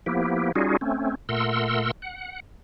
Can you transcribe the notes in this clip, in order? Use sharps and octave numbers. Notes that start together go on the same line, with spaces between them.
F3 A#3 B3 E4 G4
G3 C#4 D#4 F4 F#4 G#4
A3 C4 C#4
A#2 A3 A#4 F#5 C6 E6
F#5